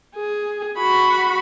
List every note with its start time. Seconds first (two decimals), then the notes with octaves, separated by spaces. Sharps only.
0.15 G#4
0.78 F#4 B5